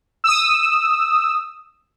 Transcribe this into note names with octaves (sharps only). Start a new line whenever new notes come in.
D#6 E6